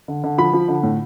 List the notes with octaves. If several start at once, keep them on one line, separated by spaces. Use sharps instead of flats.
D3
D3
F3 B5
F3
D3
A2